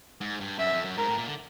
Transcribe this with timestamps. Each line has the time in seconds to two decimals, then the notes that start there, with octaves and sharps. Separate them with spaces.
0.21 G#2
0.40 G2
0.59 F#2 E5
0.73 F2
0.85 F#2
0.98 G#2 A#4
1.08 A2
1.18 A#2
1.27 D3